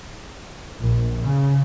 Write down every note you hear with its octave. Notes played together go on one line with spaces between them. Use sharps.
A#1
C#3